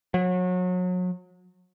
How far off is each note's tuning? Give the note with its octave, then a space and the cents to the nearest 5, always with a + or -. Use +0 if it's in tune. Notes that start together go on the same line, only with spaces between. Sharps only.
F#3 -30